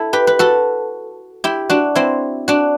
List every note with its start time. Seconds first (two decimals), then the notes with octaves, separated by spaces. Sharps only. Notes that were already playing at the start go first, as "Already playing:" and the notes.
Already playing: E4 A4
0.13 G4 B4
0.27 B4
0.39 F#4 A4
1.44 E4 G4
1.70 D4 F#4
1.95 C4 E4
2.48 D4 F#4